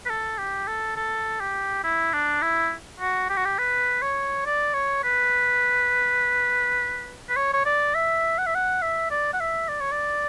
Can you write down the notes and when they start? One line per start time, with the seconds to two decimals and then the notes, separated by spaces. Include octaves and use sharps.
0.06 B4
0.10 A4
0.39 G4
0.68 A4
0.97 A4
1.41 G4
1.84 E4
2.13 D4
2.42 E4
3.00 F#4
3.30 G4
3.37 F#4
3.45 G4
3.59 B4
4.02 C#5
4.46 D5
4.74 C#5
5.04 B4
7.29 B4
7.37 C#5
7.54 C#5
7.66 D5
7.95 E5
8.38 F#5
8.47 E5
8.55 F#5
8.82 E5
9.11 D5
9.33 F#5
9.41 E5
9.69 D5
9.81 C#5
9.92 D5